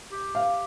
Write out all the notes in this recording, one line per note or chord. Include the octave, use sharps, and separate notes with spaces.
G4
F5